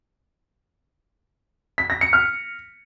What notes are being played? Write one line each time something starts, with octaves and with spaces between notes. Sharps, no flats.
B6
A#6
C#7
F6